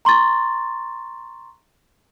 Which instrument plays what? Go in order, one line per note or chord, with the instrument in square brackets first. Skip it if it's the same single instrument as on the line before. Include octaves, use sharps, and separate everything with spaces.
[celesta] A#5 C6 C#6 A6